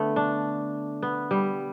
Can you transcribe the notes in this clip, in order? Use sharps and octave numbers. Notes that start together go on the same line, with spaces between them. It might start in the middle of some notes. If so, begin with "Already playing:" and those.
Already playing: D3 A3 B3
D4
B3
G3